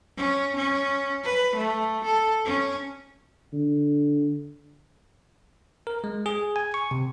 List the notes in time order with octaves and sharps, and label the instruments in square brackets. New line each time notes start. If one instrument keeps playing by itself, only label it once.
[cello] C#4
C#4
B4
A3
A4
C#4
[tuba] D3
[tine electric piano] A#4
G#3
G#4
G#5
C#6
C3